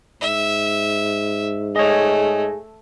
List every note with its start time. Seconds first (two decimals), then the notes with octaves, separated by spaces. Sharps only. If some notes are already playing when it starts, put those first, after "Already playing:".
0.21 G#2 E5
1.76 A3 G#4 C#5 D#5